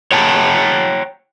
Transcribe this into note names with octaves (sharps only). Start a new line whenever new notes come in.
C#5 F#5 G5 A5 A#5